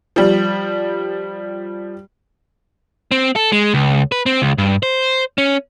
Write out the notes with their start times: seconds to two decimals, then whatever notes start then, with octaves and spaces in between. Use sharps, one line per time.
0.16 F3 G3
3.11 C4
3.36 A4
3.52 G#3
3.74 C#2
4.12 B4
4.26 C4
4.42 C#2
4.58 G2
4.83 C5
5.38 C#4